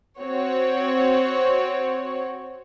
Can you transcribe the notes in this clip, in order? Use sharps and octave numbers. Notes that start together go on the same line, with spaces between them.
C4 F#4 C#5